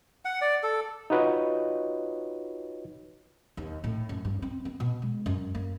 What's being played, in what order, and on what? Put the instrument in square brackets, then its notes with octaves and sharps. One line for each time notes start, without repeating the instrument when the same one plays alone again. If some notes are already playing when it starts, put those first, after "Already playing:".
[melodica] F#5
D5
A4
[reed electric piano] D#4 F4 F#4 B4 C#5 D#5
[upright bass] D#2
A2
F#2
G2
C4
B3
B2
G#3
F#2
A#3